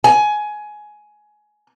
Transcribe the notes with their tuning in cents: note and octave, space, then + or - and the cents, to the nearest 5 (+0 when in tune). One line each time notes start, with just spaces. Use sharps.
G#5 +15